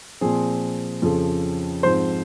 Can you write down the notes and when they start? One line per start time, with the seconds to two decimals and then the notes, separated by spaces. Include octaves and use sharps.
0.21 A#2 F3 C4 G#4
1.02 F2 C#3 F3
1.83 G#2 F3 C4 C5